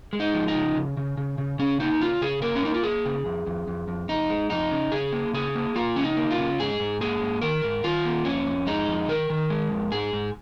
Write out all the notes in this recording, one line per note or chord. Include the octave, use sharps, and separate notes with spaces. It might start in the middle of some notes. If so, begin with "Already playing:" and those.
G#3
D#4
F3
D#4
C#3
C#3
C#3
C#3
C#3
C#3 C#4
A#3 D#4
C#3 F4
C#3 G#4
A#3 A#4
C#4
A#3 D#4
F4
A#3 G#4
C#3
F2
F2
F2
F2
F2 D#4
G#3
F2 D#4
C#3
C#3 G#4
A#3
C#3 G#4
A#3
A#3 F4
C#3 C#4
D#4
A#3
F4
C#3
G#2 G#4
G#2
A#3 G#4
G#2
D#3 A#4
G#2
D#3 F4
A#3
F2 C#4
F2
G#3 D#4
F2
D#3 A#4
D#3
G#3
F2
G#2 G#4
G#2